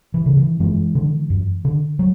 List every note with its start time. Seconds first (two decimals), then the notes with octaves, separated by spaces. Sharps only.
0.14 E3
0.26 C#3
0.37 E3
0.60 F#2 E3 G#3
0.95 D3
1.30 F#2
1.65 D3
1.99 F#3